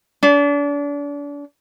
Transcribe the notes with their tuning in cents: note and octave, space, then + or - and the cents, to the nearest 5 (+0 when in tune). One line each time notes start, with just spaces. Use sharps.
D4 -35